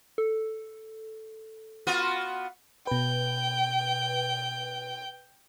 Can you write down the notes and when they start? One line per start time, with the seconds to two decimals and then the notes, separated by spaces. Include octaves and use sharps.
0.18 A4
1.87 B3 F4 F#4
2.87 B2 B4 G5